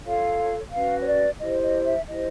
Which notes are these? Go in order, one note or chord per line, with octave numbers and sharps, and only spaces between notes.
F4 A4 C#5 F5
C#4 F#4 B4 F5
C#5
D5
E4 G4 C5 D#5
D#5
E5
E4 G4 C5 D#5